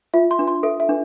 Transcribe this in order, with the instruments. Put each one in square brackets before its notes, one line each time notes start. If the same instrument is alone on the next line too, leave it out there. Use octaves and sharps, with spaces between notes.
[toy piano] F4 [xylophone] E5
[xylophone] C6
[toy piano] D4
[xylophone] C6
[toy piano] A4 [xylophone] E5
[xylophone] E5
[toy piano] D4